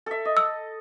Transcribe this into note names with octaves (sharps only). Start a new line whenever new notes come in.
A4 E5
D#5
E6